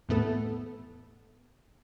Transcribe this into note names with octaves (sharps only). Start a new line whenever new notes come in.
E2 A2 A3 B3 A4